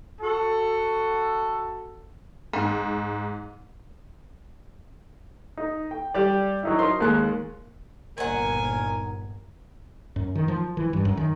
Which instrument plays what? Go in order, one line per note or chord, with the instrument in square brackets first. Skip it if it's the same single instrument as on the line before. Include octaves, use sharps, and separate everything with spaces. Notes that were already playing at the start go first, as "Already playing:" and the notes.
[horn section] F#4 A4
[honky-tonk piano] G#2
[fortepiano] D#4
G5
G3 G4 D5
F#3 D#4 E4
D#4 A#4 C5 C6
D#2 G#3 F#6
[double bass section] G1 A#2 [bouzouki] D#3 F#5 [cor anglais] A#4 [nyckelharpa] G#5
[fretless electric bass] F#2
D#3
F3
E3
G2
F#2
D#3